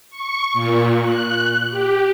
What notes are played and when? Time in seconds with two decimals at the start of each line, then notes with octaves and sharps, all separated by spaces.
0.10 C#6
0.53 A#2
1.02 F#6
1.70 G4